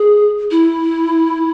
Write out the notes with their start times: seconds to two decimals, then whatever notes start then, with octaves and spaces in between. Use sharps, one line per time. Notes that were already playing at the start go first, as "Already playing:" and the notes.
Already playing: G#4
0.51 E4